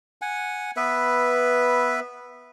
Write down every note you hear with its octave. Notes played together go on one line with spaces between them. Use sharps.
F#5 G#5
B3 B4 E5